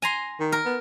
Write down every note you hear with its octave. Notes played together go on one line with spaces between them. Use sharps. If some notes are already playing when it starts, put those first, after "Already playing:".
G#5 A#5 C6
D#3
A#4
B3